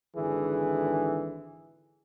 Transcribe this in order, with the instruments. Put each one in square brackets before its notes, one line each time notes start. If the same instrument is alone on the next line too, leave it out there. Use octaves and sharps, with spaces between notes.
[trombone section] G#1 D3 E3 G#4